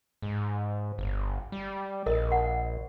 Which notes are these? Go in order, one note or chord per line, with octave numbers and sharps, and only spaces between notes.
G#2
G1
G3
A#1 A#4 D#5
F#5